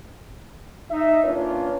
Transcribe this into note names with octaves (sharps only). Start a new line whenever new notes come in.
D#4 E5
A#3 C#4 D4 F4 B4 C#5